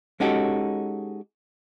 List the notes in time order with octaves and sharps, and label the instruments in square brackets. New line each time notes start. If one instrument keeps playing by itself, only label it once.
[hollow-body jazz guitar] G#3 C#4 D#4 F#4 G4 A4